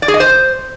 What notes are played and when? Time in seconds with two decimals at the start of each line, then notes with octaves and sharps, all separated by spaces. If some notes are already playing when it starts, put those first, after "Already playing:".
0.02 D5
0.08 G#4
0.14 D#5
0.20 C5